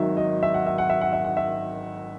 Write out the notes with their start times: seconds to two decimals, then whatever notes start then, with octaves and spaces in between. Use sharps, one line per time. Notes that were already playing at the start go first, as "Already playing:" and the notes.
Already playing: G#1 G#2 D#3 F#3 E5
0.17 D#5
0.43 E5
0.54 F#5
0.66 E5
0.78 F#5
0.90 E5
1.01 F#5
1.13 E5
1.24 F#5
1.37 E5